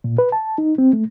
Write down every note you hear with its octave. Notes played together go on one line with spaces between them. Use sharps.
A#2
B4
A5
D#4
C4
A3